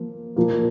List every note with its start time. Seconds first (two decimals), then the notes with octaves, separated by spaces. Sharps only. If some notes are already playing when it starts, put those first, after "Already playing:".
Already playing: F3 A#3
0.36 A#2 F3 A#3